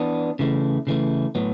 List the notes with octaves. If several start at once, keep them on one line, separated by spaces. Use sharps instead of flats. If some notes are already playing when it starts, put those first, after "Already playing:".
Already playing: E3 B3 D4
C#3 E3 A3
C#3 E3 A3
A2 F#3 B3